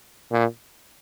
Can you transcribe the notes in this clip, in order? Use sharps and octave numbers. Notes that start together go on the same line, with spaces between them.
A#2